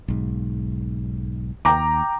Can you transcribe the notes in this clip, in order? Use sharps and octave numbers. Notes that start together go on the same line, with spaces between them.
B1 G#2
D#2 G5 A#5 D6